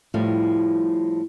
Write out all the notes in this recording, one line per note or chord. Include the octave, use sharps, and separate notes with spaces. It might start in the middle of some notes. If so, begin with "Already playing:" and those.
A2 F3 G3